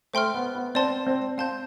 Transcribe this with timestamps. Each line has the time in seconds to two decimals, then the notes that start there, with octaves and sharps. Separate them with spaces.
0.14 A3 C5 G5 C6 F6
0.34 B3
0.55 B3
0.75 C4 D5 A5 C6
1.07 C4
1.38 C4 F5 A5 C6 G6